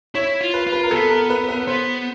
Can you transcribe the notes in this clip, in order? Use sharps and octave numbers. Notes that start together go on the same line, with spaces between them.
E4 C#5
F4
B4
F4
B4
A#4
B3 A4
A#4
B4
B4
B3 C5